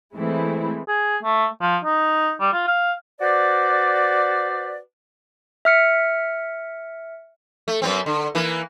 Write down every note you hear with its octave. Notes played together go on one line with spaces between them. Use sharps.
E3 G#3 A3 C4 E4
G#4
A3
F3
D#4
G3
F4
F5
F#4 B4 C5 D5
E5 F6 C#7
A3
F#2 B3 C4
D3
E3 A#3 B4